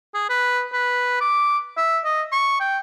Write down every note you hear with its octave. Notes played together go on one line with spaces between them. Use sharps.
G#4
B4
B4
D6
E5
D#5
C#6
G5